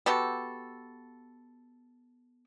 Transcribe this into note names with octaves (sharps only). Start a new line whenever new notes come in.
B3 F#4 G4 A4